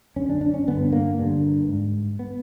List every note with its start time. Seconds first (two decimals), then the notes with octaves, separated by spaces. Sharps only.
0.16 F#2 D3 C#4
0.30 D4
0.41 D4
0.54 C#4
0.67 G2 D3 B3
0.92 A#3
1.19 G2 D3
1.68 G#2
2.19 B3